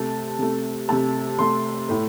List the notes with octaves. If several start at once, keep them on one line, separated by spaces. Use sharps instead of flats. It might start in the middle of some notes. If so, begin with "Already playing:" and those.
Already playing: C3 A3 A5
C3 A3
C3 A3 A5
C3 A3 C6
A2 A3